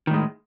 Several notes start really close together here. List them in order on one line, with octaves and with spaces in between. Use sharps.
D#3 A2 G#3